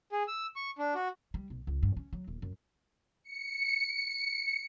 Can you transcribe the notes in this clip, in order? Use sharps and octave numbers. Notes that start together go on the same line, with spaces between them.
G#4
E6
C#6
D4
F#4
G3
B1
C#2
G2
C#4
F#3
D#1
F#2
C#7